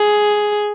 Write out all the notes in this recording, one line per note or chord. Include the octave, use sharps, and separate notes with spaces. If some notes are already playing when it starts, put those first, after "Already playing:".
Already playing: G#4